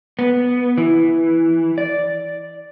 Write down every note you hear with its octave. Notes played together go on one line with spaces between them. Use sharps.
B3
E3
D5